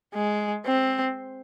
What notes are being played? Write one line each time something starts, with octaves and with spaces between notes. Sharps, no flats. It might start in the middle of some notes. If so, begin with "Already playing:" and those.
G#3
C4